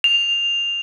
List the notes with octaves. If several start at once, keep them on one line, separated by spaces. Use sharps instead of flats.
F7